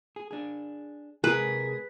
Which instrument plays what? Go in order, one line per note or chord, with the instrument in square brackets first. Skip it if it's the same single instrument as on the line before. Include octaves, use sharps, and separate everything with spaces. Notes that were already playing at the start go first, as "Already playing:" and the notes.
[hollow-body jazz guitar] G#4
D4 G#4
[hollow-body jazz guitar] C3 G#3 A#4 [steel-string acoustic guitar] G#4 [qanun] B4